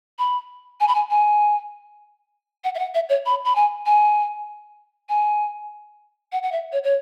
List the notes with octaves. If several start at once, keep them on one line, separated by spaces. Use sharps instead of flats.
B5
G#5
B5
G#5
G#5
F#5
E5
F#5
E5
C#5
B5
B5
G#5
G#5
G#5
F#5
F#5
E5
C#5
C#5